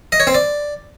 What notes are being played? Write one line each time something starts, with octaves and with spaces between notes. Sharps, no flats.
D#5
C#5
C4
D5